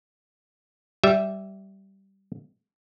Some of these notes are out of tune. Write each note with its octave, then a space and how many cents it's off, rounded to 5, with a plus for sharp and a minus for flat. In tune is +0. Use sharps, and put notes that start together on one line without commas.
G3 -15 E5 +0